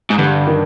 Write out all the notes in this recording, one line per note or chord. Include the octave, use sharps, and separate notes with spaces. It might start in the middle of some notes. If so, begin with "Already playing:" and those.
G#2
G2 D3
D#3